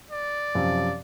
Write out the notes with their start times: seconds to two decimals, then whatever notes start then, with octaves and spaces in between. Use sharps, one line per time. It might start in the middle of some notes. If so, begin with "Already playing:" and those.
0.11 D5
0.55 F#2 C3 F3